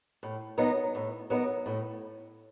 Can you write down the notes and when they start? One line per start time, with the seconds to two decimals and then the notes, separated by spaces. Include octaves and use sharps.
0.23 A2
0.58 F#3 B3 D#4
0.95 A2
1.30 F#3 B3 D#4
1.66 A2